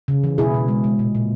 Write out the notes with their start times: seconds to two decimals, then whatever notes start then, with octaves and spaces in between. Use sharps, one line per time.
0.08 C#3
0.24 E3
0.38 B2 E4 G#4
0.54 B2
0.68 G#3
0.84 G#3
0.99 A#2
1.15 A#2